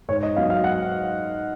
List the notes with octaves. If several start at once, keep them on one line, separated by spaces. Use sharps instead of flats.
G#2 C#5
D#5
F#3 B3 F5
F5
F#5